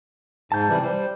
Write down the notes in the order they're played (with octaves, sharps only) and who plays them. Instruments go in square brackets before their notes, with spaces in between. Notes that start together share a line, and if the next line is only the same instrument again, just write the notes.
[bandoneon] G#2 [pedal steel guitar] A5 G6
[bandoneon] C3 E3 G3
[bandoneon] G3 [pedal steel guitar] C5